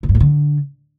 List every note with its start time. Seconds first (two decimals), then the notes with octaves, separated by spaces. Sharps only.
0.03 D3
0.09 G2
0.15 G#2
0.20 D3